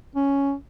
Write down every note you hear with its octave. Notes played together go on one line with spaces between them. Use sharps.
C#4